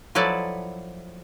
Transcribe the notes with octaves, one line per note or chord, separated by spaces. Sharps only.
F3 F#3 E4 A4 B4 D5